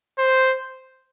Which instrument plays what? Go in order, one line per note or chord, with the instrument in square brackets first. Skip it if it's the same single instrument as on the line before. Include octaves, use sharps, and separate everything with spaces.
[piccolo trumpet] C5